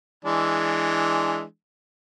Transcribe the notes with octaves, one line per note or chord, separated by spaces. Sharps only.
E3 G#3 D4